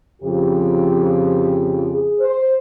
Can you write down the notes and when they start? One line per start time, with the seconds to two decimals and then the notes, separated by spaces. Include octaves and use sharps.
0.22 F2 C#3 F3 G4
1.92 G#4
2.20 C5